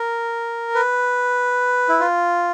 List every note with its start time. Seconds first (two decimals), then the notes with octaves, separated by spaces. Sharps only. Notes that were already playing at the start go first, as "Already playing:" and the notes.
Already playing: A#4
0.75 B4
1.89 E4
2.00 F4